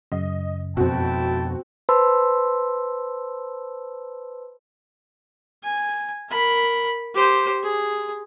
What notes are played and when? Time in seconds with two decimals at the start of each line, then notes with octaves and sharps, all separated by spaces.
0.12 F#2 C#3 D#5
0.77 F2 B2 C4 E4 F#4 G5 A5
1.89 B4 C5 A5 B5 C6 E6
5.64 G#5
6.29 A#4 B5
7.14 G4 C5
7.63 G#4